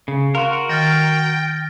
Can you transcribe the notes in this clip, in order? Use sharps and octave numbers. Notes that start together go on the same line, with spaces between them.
C#3
F#4 A#4 F5 C6
D#3 G5 F6 A6 A#6